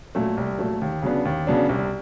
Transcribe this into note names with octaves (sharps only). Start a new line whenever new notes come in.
A#2 F#3 A3
C2
A#2 F#3 A3
D#2
C#3 F#3 B3 D4
D#2
C#3 F#3 B3 D4
C2